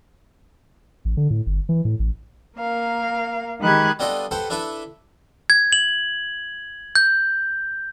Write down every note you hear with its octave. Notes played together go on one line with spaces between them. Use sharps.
A1
D3
A2
G1
E3
A2
A1
A#3 A#4 F5
D#3 G#3 G4 B5 F#6 G#6
G3 B3 D4 F4 A4 D#5
G4 A4 B4 C5 F#5
D4 E4 A4 B4 E5
G#6
F#7
G6